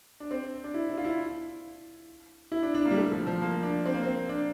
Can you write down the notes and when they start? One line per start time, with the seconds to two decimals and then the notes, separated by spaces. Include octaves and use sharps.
0.20 D4
0.31 C4
0.64 D4
0.74 E4
0.89 E4
0.97 F4
1.04 E4
2.52 E4
2.63 D4
2.74 D4
2.86 A#3
2.91 G3
2.97 A3
3.12 F3
3.27 F3
3.41 A#3
3.63 D4
3.86 C4
3.94 A#3
4.03 C4
4.29 D4